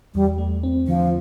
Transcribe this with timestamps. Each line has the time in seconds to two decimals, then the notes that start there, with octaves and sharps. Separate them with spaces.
0.14 E2 G3
0.38 A3
0.63 C4
0.87 D3 F3